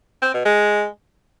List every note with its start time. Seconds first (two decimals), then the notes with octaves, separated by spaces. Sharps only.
0.22 C4
0.34 B2
0.45 G#3